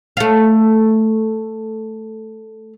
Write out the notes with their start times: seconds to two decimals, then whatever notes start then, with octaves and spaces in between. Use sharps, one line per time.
0.17 A3 F5